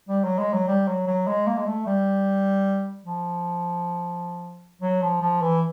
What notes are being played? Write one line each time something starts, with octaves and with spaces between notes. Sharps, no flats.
G3
F#3
G#3
F#3
G3
F#3
F#3
G#3
A#3
G#3
A3
G3
F3
F#3
F3
F3
E3